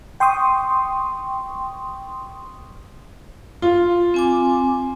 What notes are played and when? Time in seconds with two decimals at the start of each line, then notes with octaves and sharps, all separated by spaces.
0.20 G5 C6 C#6 D#6
3.62 F4
4.14 C4 G#5 D6